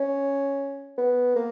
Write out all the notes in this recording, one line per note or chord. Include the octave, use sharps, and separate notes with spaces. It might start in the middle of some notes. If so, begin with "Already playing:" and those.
Already playing: C#4
B3
A#3